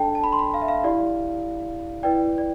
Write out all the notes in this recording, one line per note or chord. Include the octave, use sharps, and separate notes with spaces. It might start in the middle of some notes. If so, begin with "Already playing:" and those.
Already playing: D4 A4 D5 G5 A5
A5
B5
C6
B5
F5
E5
F5
E4 G4 D5
E4 B4 D5 G5
D5